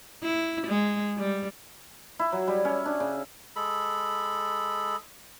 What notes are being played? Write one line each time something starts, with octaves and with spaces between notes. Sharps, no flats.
E4
G#3
G3
E4
F#3
G3
C#4
D4
C#3
G#3 A4 B5